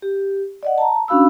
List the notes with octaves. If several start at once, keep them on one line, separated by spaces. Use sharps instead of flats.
G4
D5 D#5 F#5
A5 A#5
C#4 D4 F#4 F5 B5 E6